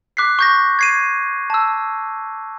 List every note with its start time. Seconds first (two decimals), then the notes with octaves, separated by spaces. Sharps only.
0.17 D6 F#6 B6 C7
0.39 C#6 G6 A#6
0.79 G#6 C7 D#7
1.50 A5 E6